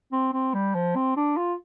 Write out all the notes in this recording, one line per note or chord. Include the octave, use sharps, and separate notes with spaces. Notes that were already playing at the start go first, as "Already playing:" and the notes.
C4
C4
G3
F3
C4
D4
F4